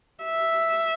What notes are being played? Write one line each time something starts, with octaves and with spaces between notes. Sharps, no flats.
E5